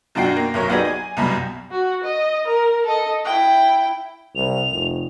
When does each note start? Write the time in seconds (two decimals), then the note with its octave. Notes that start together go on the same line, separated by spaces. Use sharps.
0.15 F#2 B2 D4 F#4 G5 C7
0.36 A#3
0.54 B1 F#2 A#4 C#5
0.69 F#3 B3 D#4 G4 G#4 D5
0.85 G#5
1.17 C2 F#2 B2 G3
1.71 F#4
2.04 D#5
2.47 A#4
2.86 A4 D#5
3.25 E4 G5
4.35 C2 F7
4.70 F1